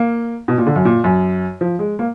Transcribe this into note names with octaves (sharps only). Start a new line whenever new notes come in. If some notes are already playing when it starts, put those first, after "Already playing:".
Already playing: A#3
B2
A#2
D3
F#2
A#2
F#2
F3
G#3
A#3